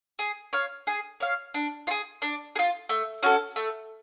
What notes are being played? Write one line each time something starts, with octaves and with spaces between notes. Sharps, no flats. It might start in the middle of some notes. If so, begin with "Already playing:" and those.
G#4
C#5 F5
G#4
C#5 F5
D4
F4
G#4
D4
G#4
F4
A3
C#4 F#4 A4
A3